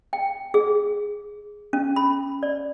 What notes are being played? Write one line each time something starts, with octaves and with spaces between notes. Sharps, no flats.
G5
G#4
C#4
B5
D5